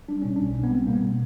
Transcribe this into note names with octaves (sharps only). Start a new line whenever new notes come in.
G3 D4
B2 C#4
B1 D4
B1
B3
G3 C4
B2 A#3
B3